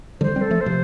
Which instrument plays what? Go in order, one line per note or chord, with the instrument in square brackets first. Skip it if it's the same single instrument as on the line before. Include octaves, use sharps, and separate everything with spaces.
[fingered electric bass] D3 G3 [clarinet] C5
[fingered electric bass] G3 C4
[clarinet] A4
[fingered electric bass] F3 A3
[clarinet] C5
[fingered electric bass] C3 F3